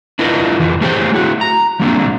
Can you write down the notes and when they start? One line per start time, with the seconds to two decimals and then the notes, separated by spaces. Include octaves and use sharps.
0.19 D4 E4 F4 A#4 B4 D#5
0.59 F2 E3 F3
0.81 A3 G4 G#4 C5 C#5 G5
1.12 A3 E4 F#4
1.41 A#5
1.80 F3 G3 A#3 C4 D4